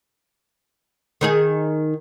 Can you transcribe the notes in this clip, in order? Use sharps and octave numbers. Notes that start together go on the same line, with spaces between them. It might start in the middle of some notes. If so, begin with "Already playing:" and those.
D#3 D#4 G#4